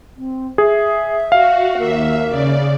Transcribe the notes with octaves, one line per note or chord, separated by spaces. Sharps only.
C4
G#4 E5
F#4 F5
D#2 A#3 E5
C#3 D5